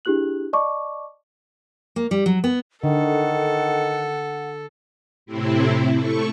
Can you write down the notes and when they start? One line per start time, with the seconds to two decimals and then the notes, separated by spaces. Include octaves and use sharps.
0.05 D4 E4 G4 G#4 F#6 F#7
0.53 D5 D#5 A5 C#6 D6
1.96 A#3
2.11 G3
2.26 F#3
2.44 B3
2.84 D3 D#3 A4 F#5
5.26 A2 C3 C4 E4
5.95 A3 C#6